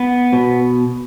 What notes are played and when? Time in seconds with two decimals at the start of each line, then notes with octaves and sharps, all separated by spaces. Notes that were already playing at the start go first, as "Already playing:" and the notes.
Already playing: B3
0.33 B2